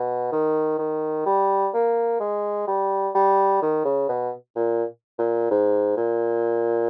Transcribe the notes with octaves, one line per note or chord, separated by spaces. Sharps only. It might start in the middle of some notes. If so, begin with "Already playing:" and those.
Already playing: B2
D#3
D#3
G3
A#3
G#3
G3
G3
D#3
C#3
B2
A#2
A#2
G#2
A#2